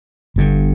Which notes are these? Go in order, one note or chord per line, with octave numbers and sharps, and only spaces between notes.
G1 G2 D3